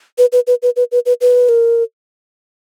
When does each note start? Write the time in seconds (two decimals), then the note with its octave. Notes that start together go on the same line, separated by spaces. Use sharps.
0.18 B4
0.32 B4
0.47 B4
0.63 B4
0.76 B4
0.92 B4
1.06 B4
1.21 B4
1.49 A#4